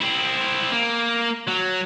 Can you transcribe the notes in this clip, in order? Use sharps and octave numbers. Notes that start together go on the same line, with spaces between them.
C4 E4
A#3
F#3